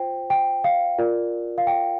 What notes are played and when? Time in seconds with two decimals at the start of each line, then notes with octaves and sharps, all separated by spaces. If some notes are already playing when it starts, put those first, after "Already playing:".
Already playing: F4 C5 G5
0.30 G5
0.64 F5
0.98 F4 A#4 D5
1.58 F5
1.67 G5